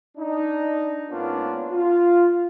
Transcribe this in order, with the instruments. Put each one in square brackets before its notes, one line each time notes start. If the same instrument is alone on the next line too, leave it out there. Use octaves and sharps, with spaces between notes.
[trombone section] D4 D#4
G#2 A#3 B3 C#4 D4 F4
F4